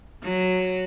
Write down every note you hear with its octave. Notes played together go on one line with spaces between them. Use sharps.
F#3